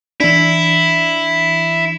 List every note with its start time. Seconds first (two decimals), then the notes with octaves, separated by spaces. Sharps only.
0.20 E3 D4 E4